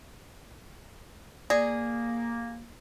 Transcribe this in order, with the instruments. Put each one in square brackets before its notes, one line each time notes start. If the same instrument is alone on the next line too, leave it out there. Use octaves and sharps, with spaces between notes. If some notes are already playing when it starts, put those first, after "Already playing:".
[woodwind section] A#3 [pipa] G#4 [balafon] D5